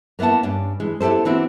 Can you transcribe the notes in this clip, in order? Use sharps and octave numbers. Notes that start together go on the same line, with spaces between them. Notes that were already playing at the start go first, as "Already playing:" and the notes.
A#3 B3 E4 F#5 A5
G2 C#4 D4
E3 G#3
B3 E4 G4 A4 C5
E3 B3 C4 D4 E4 F#4